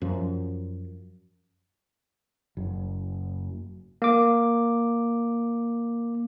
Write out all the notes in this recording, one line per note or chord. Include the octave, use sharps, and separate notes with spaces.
F#2 F3
F#1
A#3 D6